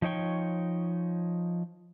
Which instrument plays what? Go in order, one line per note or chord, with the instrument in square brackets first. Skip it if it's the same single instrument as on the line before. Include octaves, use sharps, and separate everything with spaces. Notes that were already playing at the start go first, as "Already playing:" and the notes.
[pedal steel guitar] F3 D#4 C#5 G5 C#6